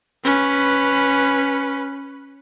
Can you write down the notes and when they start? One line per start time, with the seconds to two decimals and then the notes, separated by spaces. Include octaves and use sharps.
0.25 C#4 B4